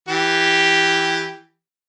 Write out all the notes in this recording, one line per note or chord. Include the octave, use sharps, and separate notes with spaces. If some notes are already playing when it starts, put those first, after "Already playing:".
E3 G4